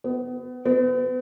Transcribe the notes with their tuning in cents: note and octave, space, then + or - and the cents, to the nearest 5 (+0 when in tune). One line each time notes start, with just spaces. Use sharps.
B3 +30
B3 +45